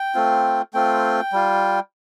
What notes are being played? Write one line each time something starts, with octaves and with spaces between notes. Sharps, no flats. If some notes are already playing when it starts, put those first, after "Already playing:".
Already playing: G5
A3 C4 F4
A3 C4 F4 G5
G3 F4